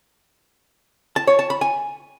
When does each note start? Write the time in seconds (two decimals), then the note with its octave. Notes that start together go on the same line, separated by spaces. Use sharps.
1.16 A5
1.27 C#5
1.39 A5
1.50 B5
1.61 G#5